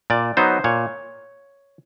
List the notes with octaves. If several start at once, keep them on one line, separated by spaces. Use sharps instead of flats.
A#2 D5
F#3 B3 D#4 C5
A#2 C#5